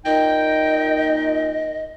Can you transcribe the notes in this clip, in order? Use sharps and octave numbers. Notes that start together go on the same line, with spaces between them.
A#2 D#4 D#5 G5